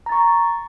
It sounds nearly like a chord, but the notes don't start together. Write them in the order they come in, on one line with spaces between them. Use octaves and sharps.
A#5 A6 C#6